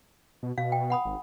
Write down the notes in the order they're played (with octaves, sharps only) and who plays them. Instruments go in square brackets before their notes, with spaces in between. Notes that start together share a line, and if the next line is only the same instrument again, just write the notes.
[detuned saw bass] B2
[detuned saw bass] B2 [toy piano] F5
[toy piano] G5
F#5 B5 D#6
[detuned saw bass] G#1